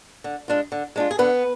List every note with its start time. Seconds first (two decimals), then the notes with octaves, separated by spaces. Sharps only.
0.24 D3
0.48 G#3 D4 F4
0.72 D3
0.96 G#3 D4 F4
1.11 G#4
1.18 D3 B3 B4